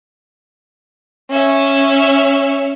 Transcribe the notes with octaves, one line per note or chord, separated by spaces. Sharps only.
C#4 E5